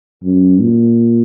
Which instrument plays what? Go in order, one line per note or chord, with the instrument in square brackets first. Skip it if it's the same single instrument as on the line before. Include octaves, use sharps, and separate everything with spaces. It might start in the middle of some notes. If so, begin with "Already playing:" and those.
[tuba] F#2
A#2